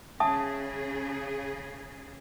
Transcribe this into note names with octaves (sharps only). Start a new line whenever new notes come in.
C#3 G#4 E5 A5 D#6